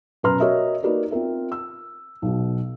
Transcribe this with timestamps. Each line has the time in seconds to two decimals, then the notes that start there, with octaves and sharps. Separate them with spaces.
0.23 F#2 B2 B4 A#5 C6 F6
0.40 F#4 A#4 C#5 D#5 E5
0.83 A#3 D#4 F#4 A#4 B4 D5
1.11 C4 F4 A#4 E5
1.52 E6
2.22 B1 B2